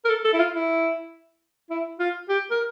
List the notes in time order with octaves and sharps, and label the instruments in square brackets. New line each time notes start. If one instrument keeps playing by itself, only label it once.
[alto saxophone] A#4
A4
A4
E4
F4
E4
E4
F4
G4
A#4